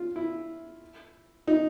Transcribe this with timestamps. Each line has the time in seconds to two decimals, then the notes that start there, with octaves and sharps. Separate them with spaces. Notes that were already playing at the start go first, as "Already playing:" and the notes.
Already playing: F4
0.16 E4
1.48 D#4